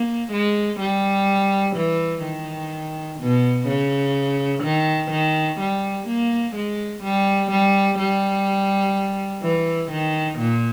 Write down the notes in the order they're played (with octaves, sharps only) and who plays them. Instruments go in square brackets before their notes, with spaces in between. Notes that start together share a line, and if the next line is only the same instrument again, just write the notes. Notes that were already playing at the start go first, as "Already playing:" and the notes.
Already playing: [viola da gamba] A#3
G#3
G3
E3
D#3
B2
C#3
D#3
D#3
G3
A#3
G#3
G3
G3
G3
E3
D#3
A#2